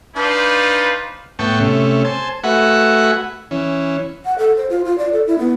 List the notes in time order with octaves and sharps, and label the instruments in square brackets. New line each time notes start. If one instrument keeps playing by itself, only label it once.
[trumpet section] D4 D#4 F4 B4 C5
[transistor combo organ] A2 B3 G5 A5 C#6
C3 A3 C#4
C5 G#5 A5
A3 F#4 B4 E5 F#5 G#5
E3 C#4
[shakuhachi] F#5
A4
C5
F4
F4
D5
A4
E4
B3